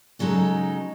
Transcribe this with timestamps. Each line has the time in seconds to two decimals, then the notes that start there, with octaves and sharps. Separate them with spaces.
0.19 C#3 F#3 G#3 D#4 A4